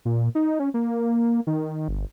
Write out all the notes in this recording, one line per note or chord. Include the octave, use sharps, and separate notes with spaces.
A#2
D#4
C#4
A#3
D#3
G1